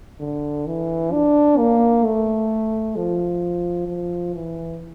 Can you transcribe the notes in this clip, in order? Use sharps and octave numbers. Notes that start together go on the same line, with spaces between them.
D3
E3
D4
A#3
A3
F3
F3
E3